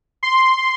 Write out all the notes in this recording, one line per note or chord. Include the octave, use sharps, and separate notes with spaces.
C6